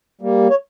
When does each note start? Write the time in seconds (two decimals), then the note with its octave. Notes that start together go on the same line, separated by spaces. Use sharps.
0.21 G3 A#3
0.50 C#5